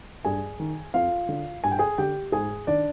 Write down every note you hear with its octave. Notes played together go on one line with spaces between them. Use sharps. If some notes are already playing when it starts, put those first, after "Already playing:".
G2 G#4 G#5
D#3
F2 F4 F5
D3
G2 G#5
G5
G#4 G#5
D3 G4 G5
G#2 G#4 G#5
D#3 D4 D5